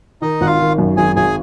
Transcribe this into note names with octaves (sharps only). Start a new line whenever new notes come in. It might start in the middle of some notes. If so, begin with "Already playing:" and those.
D#3 D#4 D#5
G#1 F#5
F4 F5
D#3
F#2
G#1 G#4 G#5
G#1 G#4 G#5